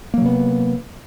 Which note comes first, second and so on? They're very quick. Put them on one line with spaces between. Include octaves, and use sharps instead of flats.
A#3 F#3 C3 B3